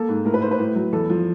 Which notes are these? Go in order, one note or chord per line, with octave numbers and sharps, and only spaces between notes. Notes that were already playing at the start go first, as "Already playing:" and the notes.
Already playing: A#3 A4
G#2
A2 A#4
B4
A2 C5
B4
A2
F#3
E2 A4
F3